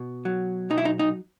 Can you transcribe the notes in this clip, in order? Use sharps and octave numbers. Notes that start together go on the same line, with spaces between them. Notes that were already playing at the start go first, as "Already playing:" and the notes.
Already playing: B2
F#3
B1 D#4
E4
D#4
D#4